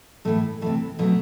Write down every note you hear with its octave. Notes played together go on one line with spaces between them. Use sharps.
A2 E3 A3
C3 E3 A3
B2 F#3 A3